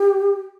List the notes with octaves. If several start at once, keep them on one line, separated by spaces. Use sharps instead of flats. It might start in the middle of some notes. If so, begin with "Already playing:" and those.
Already playing: G4